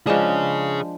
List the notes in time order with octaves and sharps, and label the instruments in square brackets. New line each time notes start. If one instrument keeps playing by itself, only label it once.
[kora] F3 G#3 D4 [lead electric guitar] G#4 C#5